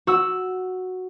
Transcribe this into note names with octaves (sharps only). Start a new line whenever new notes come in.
F#4 E6